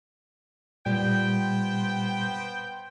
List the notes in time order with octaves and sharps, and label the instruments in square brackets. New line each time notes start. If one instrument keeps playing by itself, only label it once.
[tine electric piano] A#2 G3 [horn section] B3 C5 G5